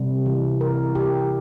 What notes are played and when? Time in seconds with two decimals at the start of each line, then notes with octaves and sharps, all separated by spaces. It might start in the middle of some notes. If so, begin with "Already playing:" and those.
Already playing: C3 G3
0.26 E3
0.61 A#4
0.95 G4